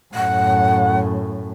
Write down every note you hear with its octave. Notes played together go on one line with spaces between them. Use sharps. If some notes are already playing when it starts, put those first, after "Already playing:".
F#2 A2 F#5